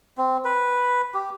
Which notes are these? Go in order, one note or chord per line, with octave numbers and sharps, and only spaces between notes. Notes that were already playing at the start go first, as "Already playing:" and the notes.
C4
B4
G4